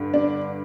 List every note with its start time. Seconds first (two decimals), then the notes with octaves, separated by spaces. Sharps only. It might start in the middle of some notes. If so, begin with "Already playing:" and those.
Already playing: G2 D3
0.14 D4